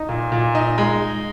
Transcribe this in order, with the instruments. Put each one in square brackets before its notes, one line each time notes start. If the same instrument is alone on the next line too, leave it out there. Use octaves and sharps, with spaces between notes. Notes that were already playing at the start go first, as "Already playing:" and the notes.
Already playing: [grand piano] D#4
A#2
A#2
D#4
G#3